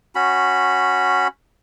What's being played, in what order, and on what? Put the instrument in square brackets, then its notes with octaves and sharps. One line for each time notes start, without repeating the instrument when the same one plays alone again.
[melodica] C#4 F#4 B5